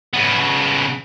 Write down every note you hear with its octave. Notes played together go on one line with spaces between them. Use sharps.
C#3 B3